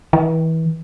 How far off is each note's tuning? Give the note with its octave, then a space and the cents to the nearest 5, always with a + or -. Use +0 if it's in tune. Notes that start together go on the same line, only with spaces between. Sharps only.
E3 -30